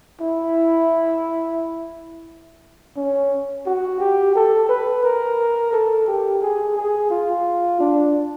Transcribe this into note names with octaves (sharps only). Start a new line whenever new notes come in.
E4
C#4
F#4
G4
A4
B4
A#4
A4
G4
G#4
G#4
F4
D4